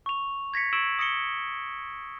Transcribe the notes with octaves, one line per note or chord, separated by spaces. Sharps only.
C#6 F7
G#6 A#6 B6 C#7
C#6 E6 G#6 D7 E7 F#7
D#6 A#6 C#7 G7